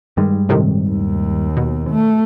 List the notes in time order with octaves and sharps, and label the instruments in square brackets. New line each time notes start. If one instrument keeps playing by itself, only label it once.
[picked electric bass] G2 G3 G#3 [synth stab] D#3
[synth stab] A2 C3 D#3
[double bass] D#2
[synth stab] B2
[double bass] A3